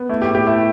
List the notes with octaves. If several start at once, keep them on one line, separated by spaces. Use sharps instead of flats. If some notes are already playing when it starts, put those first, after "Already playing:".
Already playing: B3
A3 E4
G4
A2
G4
A3 E4